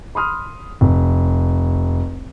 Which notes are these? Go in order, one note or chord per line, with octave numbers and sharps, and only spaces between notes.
B5 C6 D#6 F6
F1